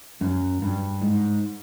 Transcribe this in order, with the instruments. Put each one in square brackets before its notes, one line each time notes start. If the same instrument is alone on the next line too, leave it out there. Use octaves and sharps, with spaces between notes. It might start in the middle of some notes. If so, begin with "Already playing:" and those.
[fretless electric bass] F#2
G2
G#2